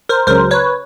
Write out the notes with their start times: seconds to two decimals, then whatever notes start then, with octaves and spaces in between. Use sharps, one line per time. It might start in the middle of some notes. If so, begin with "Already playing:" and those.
0.09 A#4 C5
0.27 C#2 C#3 F#3 A#4 C5
0.51 B4 C#5